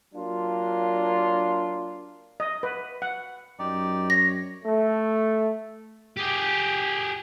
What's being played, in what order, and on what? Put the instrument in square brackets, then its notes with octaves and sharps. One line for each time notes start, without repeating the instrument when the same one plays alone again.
[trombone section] F#3 A#3 D4 F4
[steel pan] D#5
B4
F#5
[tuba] F#2 [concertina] D#4 G4 D5
[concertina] C#5 [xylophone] A#6
[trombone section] A3
[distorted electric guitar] G4 G#4